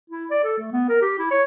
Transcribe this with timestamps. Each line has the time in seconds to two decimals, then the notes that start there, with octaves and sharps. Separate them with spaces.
0.10 E4
0.30 D5
0.44 A4
0.58 A3
0.72 B3
0.89 A#4
1.01 G4
1.19 E4
1.31 C#5